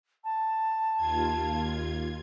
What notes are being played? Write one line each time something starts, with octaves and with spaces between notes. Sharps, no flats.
A5
D#2 F4 G#6